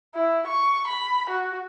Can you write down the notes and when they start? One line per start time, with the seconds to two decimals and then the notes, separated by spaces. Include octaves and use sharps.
0.15 E4
0.47 C#6
0.87 B5
1.30 F#4